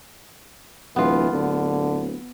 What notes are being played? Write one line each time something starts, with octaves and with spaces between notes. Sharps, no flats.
D1 E3 B3 F4
D1 D3